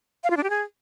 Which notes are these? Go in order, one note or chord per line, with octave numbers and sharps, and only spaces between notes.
F5
F4
D4
G4
G#4